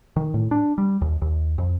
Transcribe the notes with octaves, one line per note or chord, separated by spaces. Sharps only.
D#3
A2
D4
G3
D#2
D#2
F2